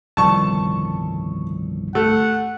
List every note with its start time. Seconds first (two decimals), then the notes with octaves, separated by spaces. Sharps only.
0.17 G1 C2 A2 D#3 F3 G3 A5 C#6
1.95 A3 F#5